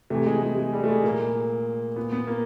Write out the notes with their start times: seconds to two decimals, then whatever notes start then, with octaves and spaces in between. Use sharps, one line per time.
0.10 C3 E3 A3
0.26 G#3
0.42 G#3
0.57 G#3
0.73 G3
0.84 A3
0.89 G#3
1.03 A#2 A#3
1.96 A#2 B3
2.12 B3
2.27 A#3